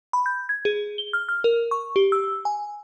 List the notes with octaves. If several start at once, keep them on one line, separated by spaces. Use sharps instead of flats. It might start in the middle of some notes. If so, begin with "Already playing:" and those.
B5
G6
G#6
G#4
G7
F6
F6
A#4
C#6
G4
E6
G#5